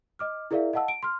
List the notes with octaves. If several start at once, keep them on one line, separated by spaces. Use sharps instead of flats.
D#5 D6 F6
E4 G#4 A#4 D5 E5 F5
D#5 F5 F#5 A5 E6
D7
C6 F6